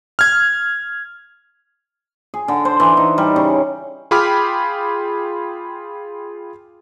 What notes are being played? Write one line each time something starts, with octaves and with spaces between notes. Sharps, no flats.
F6 G#6
G#4
D3
C5
E3
D#4
G3
C#3
F4 G#4 G5 B5 D6 F6